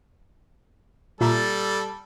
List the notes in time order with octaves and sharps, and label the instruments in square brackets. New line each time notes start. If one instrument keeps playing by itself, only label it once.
[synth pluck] A#2 E5 A#5 [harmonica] G3 A4